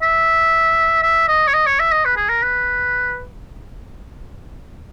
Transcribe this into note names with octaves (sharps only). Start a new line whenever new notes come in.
E5
E5
D#5
C#5
D#5
C#5
E5
D#5
B4
G#4
A#4
B4